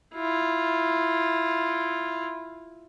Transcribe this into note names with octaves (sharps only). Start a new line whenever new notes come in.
E4 F4